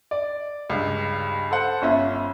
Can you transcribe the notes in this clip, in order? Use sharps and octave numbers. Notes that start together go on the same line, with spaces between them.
D5
C#2 G2 F5
A4 C5 F#5
G1 C#4 F4 E5